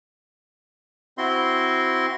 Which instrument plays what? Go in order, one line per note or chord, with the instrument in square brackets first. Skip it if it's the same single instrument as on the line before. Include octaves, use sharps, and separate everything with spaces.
[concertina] C4 E4 F#4 C6